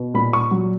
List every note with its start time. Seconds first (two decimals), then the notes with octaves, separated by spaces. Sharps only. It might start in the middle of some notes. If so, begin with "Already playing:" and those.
Already playing: B2
0.14 A#2 B5
0.33 C#6
0.51 F#3